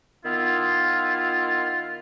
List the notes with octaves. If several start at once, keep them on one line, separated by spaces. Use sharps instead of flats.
D#3 B3 E4 F4